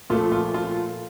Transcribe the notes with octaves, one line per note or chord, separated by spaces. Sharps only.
A#2 F3 A3 F4
F4
F4